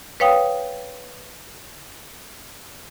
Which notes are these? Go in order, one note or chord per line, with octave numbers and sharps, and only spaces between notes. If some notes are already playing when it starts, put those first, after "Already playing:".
B4 C#5 F5 G5 D#6